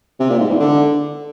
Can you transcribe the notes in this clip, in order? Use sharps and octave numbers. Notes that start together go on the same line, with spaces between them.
C3
A#2
G#2
E2
D3